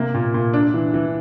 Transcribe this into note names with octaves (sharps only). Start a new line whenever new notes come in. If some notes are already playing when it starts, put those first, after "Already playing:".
Already playing: C3 A#3
A#2
A#2
D4
E3
E3